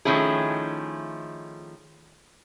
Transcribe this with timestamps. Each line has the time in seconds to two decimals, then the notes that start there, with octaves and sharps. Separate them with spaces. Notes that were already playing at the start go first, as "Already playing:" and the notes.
0.05 D#3 F3 A3 C#4 E4 G#4